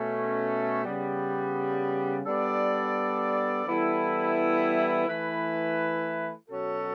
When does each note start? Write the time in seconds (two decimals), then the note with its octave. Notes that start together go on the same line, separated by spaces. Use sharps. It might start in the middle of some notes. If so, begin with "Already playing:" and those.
Already playing: B2 A3 C#4
0.83 C#3 G3 B3
2.24 G3 B3 D4 A4 D5
3.66 E3 G3 B3 E4 A4
5.08 E3 A3 E4 B4
6.49 B2 F#3 C#4 F#4 A4